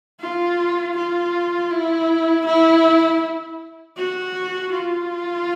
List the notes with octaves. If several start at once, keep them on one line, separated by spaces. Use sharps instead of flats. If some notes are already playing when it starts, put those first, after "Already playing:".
F4
F4
E4
E4
F#4
F4